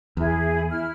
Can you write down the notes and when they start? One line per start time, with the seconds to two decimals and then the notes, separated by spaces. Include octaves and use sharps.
0.17 E2 E4 G#4
0.69 E4 F6